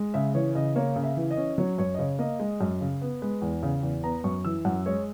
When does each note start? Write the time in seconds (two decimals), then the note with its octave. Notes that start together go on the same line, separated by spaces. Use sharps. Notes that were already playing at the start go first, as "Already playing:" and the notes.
Already playing: G#3
0.14 C#3 E5
0.35 E3 C#5
0.55 C#3 D#5
0.76 A#3 C#5
0.96 C#3
1.04 E5
1.17 E3
1.31 D#5
1.37 C#4
1.58 F#3 C#5
1.78 F#2 C#5
1.94 D#5
1.99 C#3 C#5
2.19 A#3 D#5
2.39 G#3
2.61 F#2
2.81 C#3
3.02 B3
3.22 G#3 B4
3.42 E2
3.63 C#3
3.83 E2
4.04 B3 A#5
4.24 F#2 C#6
4.45 E3 E6
4.65 F#2 F#5
4.86 G#3 C#5